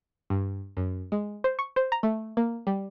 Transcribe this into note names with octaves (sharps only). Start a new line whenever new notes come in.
G2
F#2
G#3
C5
C#6
C5
A#5
A3
A#3
G3